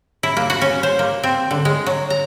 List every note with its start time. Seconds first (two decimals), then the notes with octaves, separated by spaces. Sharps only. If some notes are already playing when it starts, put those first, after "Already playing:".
0.23 E4
0.37 A#3
0.50 F#4
0.62 C#4
0.83 C5
0.99 A#3
1.23 C4
1.51 D3
1.65 G#3
1.86 F#3
2.10 A#5